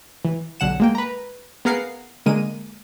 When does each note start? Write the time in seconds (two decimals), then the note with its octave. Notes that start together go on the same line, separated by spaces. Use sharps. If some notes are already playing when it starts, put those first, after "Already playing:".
0.25 E3
0.60 B1 D3 F#5 E7
0.80 G#3 A#3 G5
0.95 B4 A#5
1.65 B3 G#4 A#4 F5 F#5 C7
2.26 D3 G#3 A#3 D#7